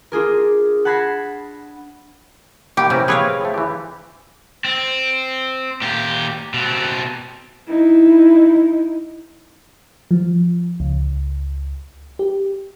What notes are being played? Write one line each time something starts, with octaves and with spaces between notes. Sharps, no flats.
D4 F4 G#4 A#4
F#5 A5 B5 G#6 A#6 C7
B2 A#3 G4
C3 C#4 E4 A#4
C4 G#4 B4 C#5 F5 G5
F3 A3
E3 G4
C4
A#2 G4
B2 C4
D#4 E4
F3
C#2
G4